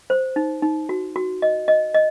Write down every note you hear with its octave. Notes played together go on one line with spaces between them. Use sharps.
C5
D#4
D#4
F#4
F#4
D#5
D#5
D#5